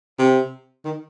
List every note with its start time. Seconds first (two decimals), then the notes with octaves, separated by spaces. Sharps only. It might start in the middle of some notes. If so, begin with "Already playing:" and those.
0.19 C3
0.85 D#3